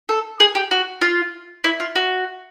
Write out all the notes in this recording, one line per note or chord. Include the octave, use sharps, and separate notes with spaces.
A4
G#4
G4
F#4
F4
E4
F4
F#4